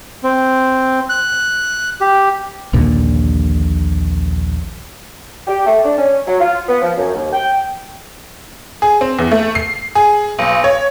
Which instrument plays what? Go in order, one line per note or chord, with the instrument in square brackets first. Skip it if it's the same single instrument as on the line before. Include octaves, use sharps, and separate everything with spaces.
[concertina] C4
F#6
G4
[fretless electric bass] A#1 D#2 A#2 D3
[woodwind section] G4
A3
D4
C#4
F#3
F4
B3
F3
F#2
D#2
G5
[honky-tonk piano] G#4
C4
E2
A3
C7
G#4
B1
C#5